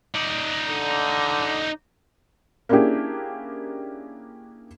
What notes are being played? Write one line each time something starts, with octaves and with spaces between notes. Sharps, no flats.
D#4 D5
D3
A#3 C#4 D4 E4 G4 G#4